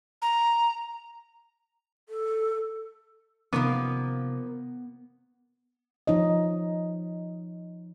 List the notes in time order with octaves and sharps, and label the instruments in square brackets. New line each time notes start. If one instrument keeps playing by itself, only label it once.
[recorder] A#5
[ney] A4
[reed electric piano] C3 D6 [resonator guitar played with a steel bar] D#3 F3 A#3 [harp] B3
[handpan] F3 D#4 C#5 D#5